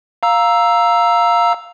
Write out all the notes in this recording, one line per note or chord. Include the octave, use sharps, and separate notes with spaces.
F5 A#5 E6